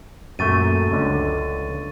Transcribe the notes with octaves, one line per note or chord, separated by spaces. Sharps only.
F#2 A#2 A3 C#6 A6 D#7
C#2 D3